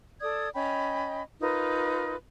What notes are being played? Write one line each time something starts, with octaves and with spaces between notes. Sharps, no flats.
A4 D5 D#6 G#6
C#4 D#5 G5 B5
D#4 F4 A#4 B4